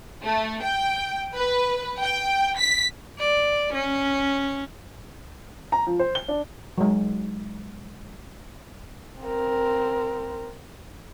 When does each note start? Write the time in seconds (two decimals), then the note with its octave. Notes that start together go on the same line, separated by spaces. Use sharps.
0.22 A3
0.63 G5
1.35 B4
2.01 G5
2.57 B6
3.19 D5
3.74 C#4
5.72 A#5
5.87 F3
5.99 C5
6.15 G7
6.28 D4
6.78 F#3 G#3
9.20 C4 A#4